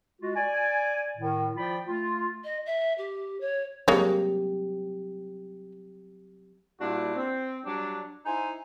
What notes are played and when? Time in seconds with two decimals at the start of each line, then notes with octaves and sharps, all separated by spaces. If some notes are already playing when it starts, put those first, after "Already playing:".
0.20 G#3 F4 F#4
0.35 D5 G#5
1.17 A2 D#3
1.56 F3 F4 D5 G5 B5
1.87 A3 F4
2.44 D#5
2.66 E5
2.98 G4
3.40 C#5
3.88 F#3 G#3 A#3 C4 G4 C#5
6.79 A#2 G3 D4 E4 F#4
7.16 C4
7.65 F#3 G3 D4
8.25 D#4 E4 C5 G#5